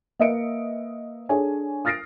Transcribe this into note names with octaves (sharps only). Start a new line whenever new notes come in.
A#3 B4 D#5 E5 C#7 D7
D4 G#4 A4 C#5 G#5
D#6 F6 A6 A#6 C7 D7